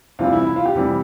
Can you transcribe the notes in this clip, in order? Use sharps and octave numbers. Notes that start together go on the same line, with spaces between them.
C3 E3 G3 F4
E4
E4
F4
G4
C3 E3 G3